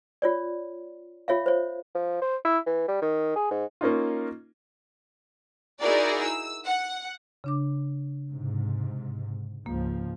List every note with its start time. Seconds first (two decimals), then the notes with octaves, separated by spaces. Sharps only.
0.22 F4 C#5 D5
1.28 F4 C#5 E5 F5
1.46 C5 C#5
1.95 F3
2.21 C5
2.45 E4
2.66 E3
2.88 G3
3.02 D#3
3.36 G#4
3.51 G#2
3.81 A#3 C#4 D#4 F4
5.81 D#4 E4 F#4 G#4 A#4 D5
6.23 E6
6.66 F#5
7.44 C#3 D4 D6
8.30 G#2 C3
9.66 C#2 G#2 F3 A#3